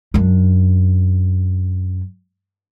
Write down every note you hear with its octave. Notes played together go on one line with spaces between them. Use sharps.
F#2 D4